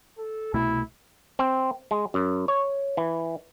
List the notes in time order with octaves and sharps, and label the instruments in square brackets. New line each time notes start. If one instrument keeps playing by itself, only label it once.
[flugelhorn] A4
[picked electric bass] C2 B2 A3 [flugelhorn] E4
[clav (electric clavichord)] C4
G#3
F#2
C#5
E3